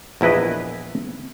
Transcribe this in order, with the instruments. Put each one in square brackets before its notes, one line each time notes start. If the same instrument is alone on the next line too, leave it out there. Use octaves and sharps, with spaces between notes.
[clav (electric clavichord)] A#1 E2 E4 B4 D#5